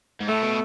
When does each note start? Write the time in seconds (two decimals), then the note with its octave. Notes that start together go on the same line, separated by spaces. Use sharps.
0.21 G#2
0.28 A2 A3
0.43 B2